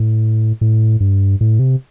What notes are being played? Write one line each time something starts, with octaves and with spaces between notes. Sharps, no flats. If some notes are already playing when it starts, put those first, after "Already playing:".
Already playing: A2
A2
G2
A2
C3